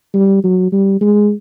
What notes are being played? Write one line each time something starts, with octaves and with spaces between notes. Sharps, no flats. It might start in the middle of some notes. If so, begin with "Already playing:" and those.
G3
F#3
G3
G#3